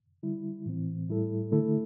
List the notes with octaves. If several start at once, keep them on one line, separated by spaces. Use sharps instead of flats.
D3 G3 E4
A2 E3 C4
A2 G3 E4 A4
D3 A3 E4 A4